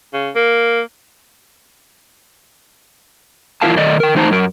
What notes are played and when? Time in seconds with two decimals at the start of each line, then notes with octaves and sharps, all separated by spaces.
0.13 C#3
0.35 A#3
3.62 E2 E4 F4 A#4 F5 A5
3.77 D#3 A3 D5 D#5
4.00 A#4 G5
4.15 E3 A3 D#4 C5 A5 A#5
4.31 F#2 A#4